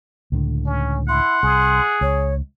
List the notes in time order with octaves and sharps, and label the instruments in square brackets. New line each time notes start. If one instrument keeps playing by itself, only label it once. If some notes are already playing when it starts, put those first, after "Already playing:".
[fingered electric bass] C#2 A2 D3
[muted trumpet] C#4
[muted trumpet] E4 [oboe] F#5 [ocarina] C6
[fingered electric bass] C2 [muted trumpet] G#4
[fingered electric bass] C#2 [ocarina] C#5